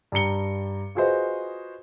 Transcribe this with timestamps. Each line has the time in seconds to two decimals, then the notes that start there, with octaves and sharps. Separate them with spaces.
0.12 G2 G4 A#5 C#7 G7
0.95 F4 F#4 G#4 B4 C5 D#5